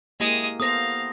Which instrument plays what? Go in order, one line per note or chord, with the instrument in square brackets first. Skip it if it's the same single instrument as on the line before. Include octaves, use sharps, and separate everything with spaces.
[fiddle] G#3 D#6 [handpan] A#3 E4 G4
[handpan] B3 A4 C5 [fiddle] F5 [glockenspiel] D#6 A#6